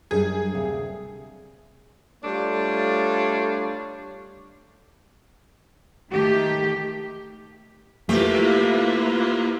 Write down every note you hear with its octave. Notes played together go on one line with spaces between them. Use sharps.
F#2 G3 D4 G#4
D2 C3 F5
G3 A3 D4 F4 C#5
D#3 A3 G4
C3 A3 A#3 E4 F4 G4 B4